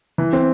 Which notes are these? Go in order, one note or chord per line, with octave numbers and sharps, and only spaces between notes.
E3
C4